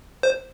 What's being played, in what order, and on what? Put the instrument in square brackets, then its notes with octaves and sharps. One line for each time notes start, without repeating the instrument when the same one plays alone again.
[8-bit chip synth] C5